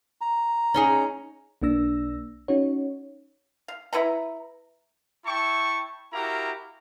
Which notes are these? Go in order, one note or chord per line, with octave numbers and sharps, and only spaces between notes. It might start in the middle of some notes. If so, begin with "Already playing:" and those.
A#5
C#4 D#4 G#4
B1 A#3 D4 E6 A#6
C#4 D#4 F#4 C#5
F5
E4 B4 F#5 A#5
E4 G5 A5 C#6
E4 F#4 G4 A#4 F5 A#5